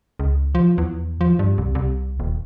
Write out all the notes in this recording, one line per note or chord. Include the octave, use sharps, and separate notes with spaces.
C#2
F3
E2
F3
G2
C2
C2
D#1